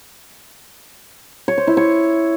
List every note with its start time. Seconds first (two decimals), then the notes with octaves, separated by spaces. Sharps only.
1.48 C#5
1.58 C5
1.67 E4
1.77 C#5